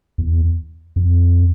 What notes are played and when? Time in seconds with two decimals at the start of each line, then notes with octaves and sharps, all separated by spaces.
0.18 E2
0.96 F2